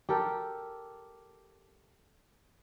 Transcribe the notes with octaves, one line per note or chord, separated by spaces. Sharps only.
G4 A4 A#4